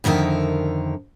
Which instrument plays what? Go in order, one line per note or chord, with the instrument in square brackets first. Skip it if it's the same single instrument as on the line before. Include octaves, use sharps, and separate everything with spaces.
[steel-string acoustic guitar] F2 D3 D#3 A#4 E5